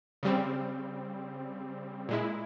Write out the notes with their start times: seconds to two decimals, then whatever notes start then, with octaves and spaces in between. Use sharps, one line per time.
0.23 C#3 G3 C4
2.09 A#2 G#3 E4